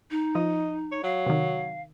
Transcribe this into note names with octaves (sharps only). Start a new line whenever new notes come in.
D#4
F3 D#5
C#5
F#3 F5
C3 D#3